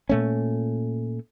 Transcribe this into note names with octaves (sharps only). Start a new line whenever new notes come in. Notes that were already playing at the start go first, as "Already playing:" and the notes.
A#2 A3 C#4